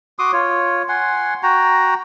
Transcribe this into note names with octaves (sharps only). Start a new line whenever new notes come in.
F#4 C6 D6 D#6
F4 C#5
F#5 G#5 C6
F#4 G5 A#5